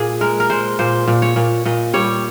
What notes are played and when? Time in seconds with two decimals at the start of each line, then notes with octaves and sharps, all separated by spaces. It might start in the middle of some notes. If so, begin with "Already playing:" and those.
Already playing: A#2 G#4
0.21 G#3 A#4
0.40 A#4
0.50 G#3 C5
0.79 A#2 C5
1.08 A#2
1.22 C#5
1.36 A#2
1.66 A#2 D#5
1.94 G3 C#5